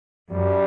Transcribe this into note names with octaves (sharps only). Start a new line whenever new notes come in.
F#2 G3